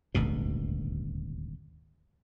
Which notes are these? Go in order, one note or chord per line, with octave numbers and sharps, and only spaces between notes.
D#1 G#1 D2 B2